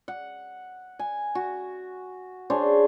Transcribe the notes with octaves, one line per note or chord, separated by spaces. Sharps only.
F#5
G#5
F#4
D4 G#4 C5 C#5